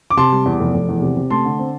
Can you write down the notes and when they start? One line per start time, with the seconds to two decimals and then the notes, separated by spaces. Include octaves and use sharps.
0.10 D6
0.17 C3 A5 C6
0.32 G3
0.46 E2
0.60 F1
0.74 F1
0.89 E2
1.02 C3
1.17 C3
1.30 A3 A5 C6
1.45 D3
1.59 C4